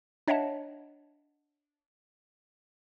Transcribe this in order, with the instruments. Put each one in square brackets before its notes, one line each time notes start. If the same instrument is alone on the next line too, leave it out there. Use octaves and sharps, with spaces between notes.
[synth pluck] D4 C#5 D#5 E5 F#5 A5